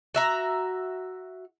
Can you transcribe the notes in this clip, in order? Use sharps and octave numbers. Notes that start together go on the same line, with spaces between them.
F#4 E5 A#5